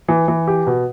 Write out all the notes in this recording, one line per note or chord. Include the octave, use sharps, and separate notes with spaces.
E3
E3
G4
B2